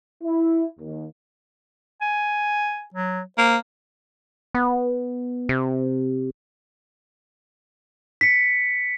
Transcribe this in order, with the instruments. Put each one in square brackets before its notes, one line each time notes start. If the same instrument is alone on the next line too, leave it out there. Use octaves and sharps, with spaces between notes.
[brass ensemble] E4
D#2
[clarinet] G#5
F#3
[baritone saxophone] A#3 [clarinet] C5
[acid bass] B3
C3
[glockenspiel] B6 C#7